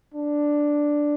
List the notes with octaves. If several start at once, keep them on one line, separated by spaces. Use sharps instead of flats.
D4